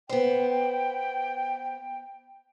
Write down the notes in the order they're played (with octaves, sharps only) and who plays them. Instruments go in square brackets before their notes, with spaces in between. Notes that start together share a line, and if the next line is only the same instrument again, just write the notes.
[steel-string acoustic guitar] B3 C5 [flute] G5